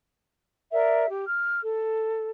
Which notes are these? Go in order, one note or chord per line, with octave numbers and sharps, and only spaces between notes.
A#4 D5 E5
G4
F6
A4